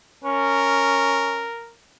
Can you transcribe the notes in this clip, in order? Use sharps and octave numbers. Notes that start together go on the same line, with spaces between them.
C#4 A#4